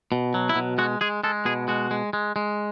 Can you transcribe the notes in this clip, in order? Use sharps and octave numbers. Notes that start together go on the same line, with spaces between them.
B2
F#3
E4
B2
G#3 F#4
G#3 G#4
G#3 A4
B2 G#4
G#3 F#4
G#3
G#3
G#3